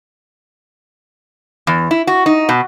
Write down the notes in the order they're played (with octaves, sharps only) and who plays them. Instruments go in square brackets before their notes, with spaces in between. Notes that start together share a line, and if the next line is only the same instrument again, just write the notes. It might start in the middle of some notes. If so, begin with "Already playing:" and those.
[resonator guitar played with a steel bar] E2
E4
F#4
D#4
B2